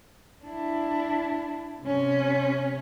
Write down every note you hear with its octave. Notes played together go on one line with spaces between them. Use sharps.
D4 E4
C3 C#4